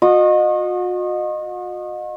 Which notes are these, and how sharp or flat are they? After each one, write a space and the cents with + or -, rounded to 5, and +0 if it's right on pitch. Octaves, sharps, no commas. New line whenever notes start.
F#4 -45 D#5 -20